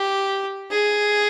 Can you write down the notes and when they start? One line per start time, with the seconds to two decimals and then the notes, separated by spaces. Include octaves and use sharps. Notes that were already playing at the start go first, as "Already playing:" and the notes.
Already playing: G4
0.71 G#4